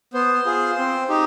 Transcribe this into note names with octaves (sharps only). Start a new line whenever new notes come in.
B3 C5
F4 G#4
C4
D#4 G4